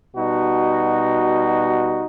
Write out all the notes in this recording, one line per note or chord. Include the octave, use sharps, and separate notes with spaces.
B2 G3 D#4 F#4